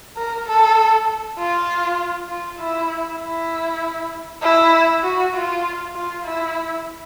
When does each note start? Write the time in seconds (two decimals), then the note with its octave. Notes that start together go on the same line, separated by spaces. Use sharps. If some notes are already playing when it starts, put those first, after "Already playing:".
0.17 A#4
0.46 A4
1.38 F4
2.29 F4
2.59 E4
3.20 E4
4.42 E4
5.03 F#4
5.34 F4
5.95 F4
6.24 E4